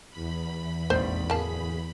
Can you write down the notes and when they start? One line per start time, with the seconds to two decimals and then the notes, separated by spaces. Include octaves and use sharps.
0.11 E2 B5
0.90 F1 A#1 G#2 C5
1.30 D1 A#3 G#4 A5